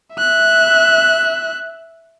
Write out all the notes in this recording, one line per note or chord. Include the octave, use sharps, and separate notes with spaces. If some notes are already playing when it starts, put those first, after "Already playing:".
E5 F#6